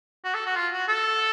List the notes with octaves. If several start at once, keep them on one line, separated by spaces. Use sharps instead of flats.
F#4
A4
F#4
F4
F#4
A4